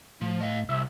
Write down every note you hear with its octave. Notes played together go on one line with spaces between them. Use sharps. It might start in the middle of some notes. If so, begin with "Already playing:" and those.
A2 F3
D#5 F5
C2 E5